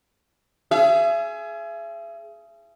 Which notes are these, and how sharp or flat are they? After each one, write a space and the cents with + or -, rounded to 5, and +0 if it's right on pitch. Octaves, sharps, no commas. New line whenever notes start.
G#4 +20 E5 +40